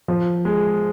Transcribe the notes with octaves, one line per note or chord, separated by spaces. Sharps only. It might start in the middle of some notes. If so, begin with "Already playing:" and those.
F3
G#3